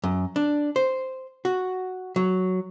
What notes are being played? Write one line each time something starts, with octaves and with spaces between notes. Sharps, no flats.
F#2
D4
C5
F#4
F#3